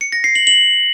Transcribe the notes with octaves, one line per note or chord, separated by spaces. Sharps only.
C#7
A#6
C7
F#7
F#7